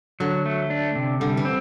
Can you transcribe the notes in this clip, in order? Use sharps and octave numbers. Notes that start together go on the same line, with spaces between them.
D3 F#3
A3
D4
C3
D3 G3
E3
C4